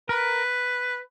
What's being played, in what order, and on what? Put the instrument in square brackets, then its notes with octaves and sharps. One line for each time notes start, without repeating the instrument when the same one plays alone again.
[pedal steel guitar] A#4 [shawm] B4